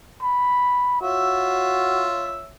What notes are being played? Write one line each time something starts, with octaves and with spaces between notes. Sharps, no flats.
B5
F4 F#4 C#5 E5